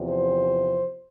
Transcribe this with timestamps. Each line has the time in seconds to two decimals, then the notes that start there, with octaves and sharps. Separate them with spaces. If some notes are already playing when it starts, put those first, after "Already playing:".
Already playing: E2 C3 F3
0.09 C5